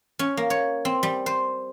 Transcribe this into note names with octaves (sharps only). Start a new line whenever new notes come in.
C#4
A#3
C#5
C4
G3
C5